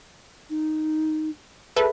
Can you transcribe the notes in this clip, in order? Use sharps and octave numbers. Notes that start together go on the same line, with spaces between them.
D#4
G#4 A4 B4 E5